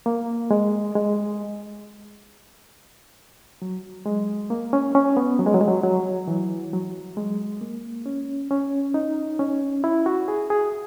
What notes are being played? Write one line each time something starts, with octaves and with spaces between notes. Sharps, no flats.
A#3
G#3
G#3
F#3
G#3
A#3
C#4
C#4
B3
F#3
G#3
F#3
G#3
F#3
F#3
E3
F#3
G#3
A#3
C#4
C#4
D#4
C#4
E4
F#4
G#4
G#4